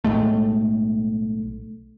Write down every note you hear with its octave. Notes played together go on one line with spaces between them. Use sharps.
B1 A2 G#3 A3